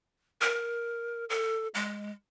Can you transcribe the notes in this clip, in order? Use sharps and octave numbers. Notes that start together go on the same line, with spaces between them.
A#4
A4
G#3